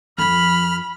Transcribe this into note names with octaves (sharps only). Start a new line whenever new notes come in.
F2 F3 B5 F6